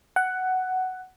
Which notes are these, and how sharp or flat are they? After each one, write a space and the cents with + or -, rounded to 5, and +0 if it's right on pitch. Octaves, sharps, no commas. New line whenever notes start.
F#5 +10